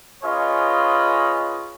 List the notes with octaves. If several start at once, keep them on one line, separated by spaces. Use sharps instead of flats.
C#4 F4 G#4 B4 C#5 D#5